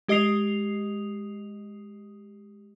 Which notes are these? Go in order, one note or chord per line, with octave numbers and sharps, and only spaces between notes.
G#3 G4 D#5 D#6 C7 F7